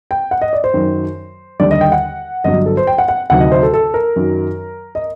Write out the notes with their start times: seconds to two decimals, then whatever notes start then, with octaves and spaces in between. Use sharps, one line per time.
0.11 G5
0.31 F#5
0.42 D#5
0.53 D5
0.64 C5
0.74 F#2 D#3 F#3
1.60 D#2 D3 G3 D5
1.71 D#5
1.81 G5
1.92 F#5
2.44 G1 G2 F#3 D#5
2.66 A4
2.77 C5
2.87 G5
2.98 F#5
3.08 F#5
3.30 D2 C3 D#3 F#3 F#5
3.40 D#5
3.52 C5
3.63 A4
3.74 A4
3.94 A#4
4.16 F#2 D#3 F#3
4.95 D#5